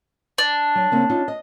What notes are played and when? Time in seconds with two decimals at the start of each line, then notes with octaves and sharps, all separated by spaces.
0.38 D4
0.75 F#3
0.92 C#3 A#3 C4
1.10 C#4 D#4 F4
1.28 D#5